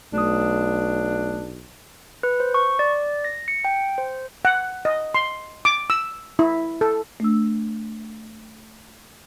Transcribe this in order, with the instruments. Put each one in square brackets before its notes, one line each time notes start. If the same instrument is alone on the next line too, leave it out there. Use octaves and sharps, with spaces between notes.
[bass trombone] B1 [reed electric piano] A3 D#6 [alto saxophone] D4
[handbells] B4
C5
C#6
D5
A#6
C#7
G5
C5
[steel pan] F#5
D#5
C6
D6
E6
E4
A4
[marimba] A3 D4 E6